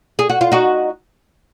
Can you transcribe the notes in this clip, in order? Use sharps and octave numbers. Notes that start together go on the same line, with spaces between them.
G#4
F#4
F4
D#4 F#4